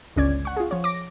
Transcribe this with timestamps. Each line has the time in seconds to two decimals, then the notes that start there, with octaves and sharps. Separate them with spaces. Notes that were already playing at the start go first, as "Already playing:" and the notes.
0.16 G1 C#2 C#4 D5 G#6
0.45 F#5 C#6
0.57 F4 G#4
0.71 F3 C#5
0.84 D6 A#6